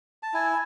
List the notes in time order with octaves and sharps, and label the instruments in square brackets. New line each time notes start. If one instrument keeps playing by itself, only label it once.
[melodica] A5
E4 G#5